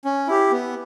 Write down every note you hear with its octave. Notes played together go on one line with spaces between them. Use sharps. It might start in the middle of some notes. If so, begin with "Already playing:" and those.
C#4
E4 G4
B3